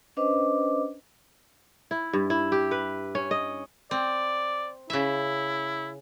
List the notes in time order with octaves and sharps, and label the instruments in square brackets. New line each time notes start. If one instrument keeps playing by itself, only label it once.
[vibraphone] C#4 D4 B4 C5 D#5 D6
[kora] E4
G2
E4
G4
B4
C#4
D#5
[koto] C4 [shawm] D5
[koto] C#3 E5 [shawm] E4